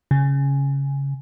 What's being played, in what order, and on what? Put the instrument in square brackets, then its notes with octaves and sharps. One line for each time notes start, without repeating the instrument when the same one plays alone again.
[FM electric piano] C#3